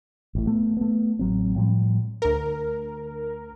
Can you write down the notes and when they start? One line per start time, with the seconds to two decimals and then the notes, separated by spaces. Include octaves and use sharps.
0.35 A1 A2
0.47 A3 B3
0.77 A3 B3
1.19 A1 F#3 C4
1.56 A2 F3 G3
2.22 D2 A#4